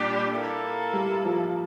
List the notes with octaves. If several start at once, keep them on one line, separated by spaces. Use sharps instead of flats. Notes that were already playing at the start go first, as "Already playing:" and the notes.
Already playing: A#2 G3 D4 G4
A#3 E4 A4
G3
F3